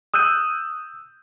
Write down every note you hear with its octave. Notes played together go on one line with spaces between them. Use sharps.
D#6 E6 F#6 G6 D#7